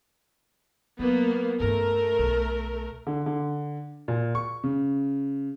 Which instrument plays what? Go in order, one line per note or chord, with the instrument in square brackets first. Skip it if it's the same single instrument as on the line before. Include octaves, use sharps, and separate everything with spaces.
[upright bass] F#3 [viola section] A#3 B3
[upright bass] G2 C#4 [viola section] A3 A#4
[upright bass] B1
[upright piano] D3
D3
A#2
C#6
C#3